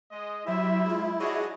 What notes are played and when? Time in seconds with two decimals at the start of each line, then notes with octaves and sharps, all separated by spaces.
0.12 G#3 D#5
0.46 F#3 G3 E4 G4 C5 E5
0.85 G#3 F4
1.20 D4 F#4 G#4 C#5 D#5